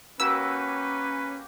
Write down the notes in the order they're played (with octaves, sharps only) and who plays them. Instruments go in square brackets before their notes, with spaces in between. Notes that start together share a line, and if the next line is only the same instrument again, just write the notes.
[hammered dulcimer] A#3 F#4 G4 [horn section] C#4 [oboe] B4 [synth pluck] E6